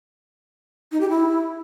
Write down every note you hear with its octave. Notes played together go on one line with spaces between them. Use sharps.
D#4
G4
E4